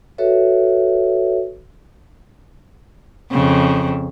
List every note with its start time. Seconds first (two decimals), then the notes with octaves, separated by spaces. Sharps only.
0.18 F#4 A4 B4 C#5 E5
3.31 F2 C#3